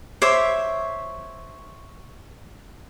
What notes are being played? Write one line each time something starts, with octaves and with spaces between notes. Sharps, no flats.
C5 C#5 E5 D6